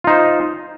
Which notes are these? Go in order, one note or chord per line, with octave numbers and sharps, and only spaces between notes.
D#4 F4 C5